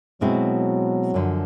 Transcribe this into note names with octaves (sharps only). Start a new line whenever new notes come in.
B2 F#3 G#3 C4 E4
F#2 D3 F3